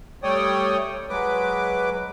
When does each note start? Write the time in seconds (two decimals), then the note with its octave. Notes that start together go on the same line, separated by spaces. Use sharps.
0.23 G3 A3 C#5 D5 G5 D#6
1.10 F#3 G#3 B4 D6